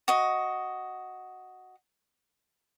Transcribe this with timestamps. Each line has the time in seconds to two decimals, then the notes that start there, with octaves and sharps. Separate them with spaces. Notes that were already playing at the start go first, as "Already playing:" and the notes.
0.08 F#4 D#5